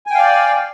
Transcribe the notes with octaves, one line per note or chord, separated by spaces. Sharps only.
D5 F5 G5 G#5